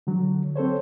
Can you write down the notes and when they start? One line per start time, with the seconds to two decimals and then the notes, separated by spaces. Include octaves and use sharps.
0.07 D3 F#3
0.56 C4 A4 C5 C#5